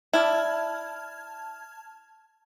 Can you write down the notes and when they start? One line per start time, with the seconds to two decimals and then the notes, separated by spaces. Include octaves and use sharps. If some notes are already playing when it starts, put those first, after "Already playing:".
0.13 E4 D5 A5 F6 G#6